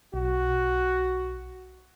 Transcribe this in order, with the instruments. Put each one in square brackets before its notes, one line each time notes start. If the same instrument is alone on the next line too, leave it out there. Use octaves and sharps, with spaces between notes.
[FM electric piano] B1 [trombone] F#4